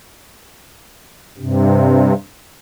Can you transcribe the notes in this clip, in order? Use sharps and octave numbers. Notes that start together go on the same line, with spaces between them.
G2 C3